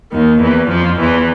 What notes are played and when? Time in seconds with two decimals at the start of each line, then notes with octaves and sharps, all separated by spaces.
0.12 D#2 D#3
0.40 E2 E3
0.69 F2 F3
0.98 E2 E3